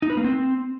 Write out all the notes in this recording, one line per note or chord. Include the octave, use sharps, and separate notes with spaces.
D#4
B4
A#3
C4